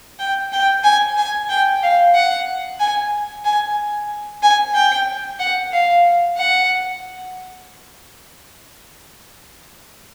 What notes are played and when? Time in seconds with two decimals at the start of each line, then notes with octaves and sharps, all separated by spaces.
0.19 G5
0.53 G5
0.84 G#5
1.17 G#5
1.49 G5
1.82 F5
2.14 F#5
2.80 G#5
3.45 G#5
4.43 G#5
4.75 G5
5.39 F#5
5.72 F5
6.37 F#5